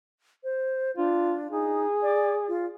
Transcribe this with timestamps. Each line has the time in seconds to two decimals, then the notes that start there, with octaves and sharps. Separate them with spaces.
0.44 C5
0.97 D4 F4
1.51 D#4 G#4
2.02 D5
2.48 F4